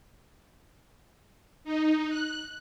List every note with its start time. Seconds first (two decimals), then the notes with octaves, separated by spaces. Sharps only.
1.64 D#4
2.09 F#6